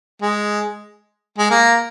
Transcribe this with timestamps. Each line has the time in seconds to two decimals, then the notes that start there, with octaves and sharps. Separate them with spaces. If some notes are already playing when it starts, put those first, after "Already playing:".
0.22 G#3
1.38 G#3
1.51 A#3